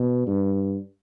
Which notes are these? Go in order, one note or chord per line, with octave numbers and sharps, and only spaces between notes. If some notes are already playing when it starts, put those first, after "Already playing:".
Already playing: B2
G2